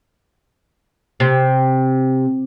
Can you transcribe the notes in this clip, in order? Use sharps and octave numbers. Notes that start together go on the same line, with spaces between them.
C3